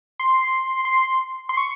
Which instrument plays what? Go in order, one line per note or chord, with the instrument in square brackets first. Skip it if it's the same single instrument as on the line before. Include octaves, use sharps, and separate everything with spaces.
[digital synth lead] C6
C6
C6
C#6